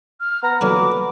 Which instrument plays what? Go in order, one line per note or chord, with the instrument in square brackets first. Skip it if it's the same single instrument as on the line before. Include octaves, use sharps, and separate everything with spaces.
[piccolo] F6
[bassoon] B3 [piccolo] A#5
[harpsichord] A#2 D3 F#3 [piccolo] D6